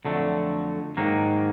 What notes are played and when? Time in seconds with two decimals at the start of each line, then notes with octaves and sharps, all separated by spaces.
0.05 F2 D3 F#3 A3
0.97 G#2 D#3 F#3 A#3